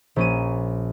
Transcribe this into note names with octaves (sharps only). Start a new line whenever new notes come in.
A#1 C#4 D#7